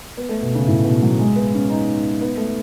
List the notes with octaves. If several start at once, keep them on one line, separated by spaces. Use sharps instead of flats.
B3
A3
B2
C#3
A2
B2
F#3
G#3
B3
C#4
D#4
B3
A3